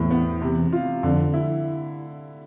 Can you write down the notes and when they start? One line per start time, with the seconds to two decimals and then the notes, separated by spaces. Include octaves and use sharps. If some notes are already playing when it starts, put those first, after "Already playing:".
Already playing: E2 A2 C4
0.11 B3
0.42 C3
0.72 F4
1.03 F2 D3
1.34 E4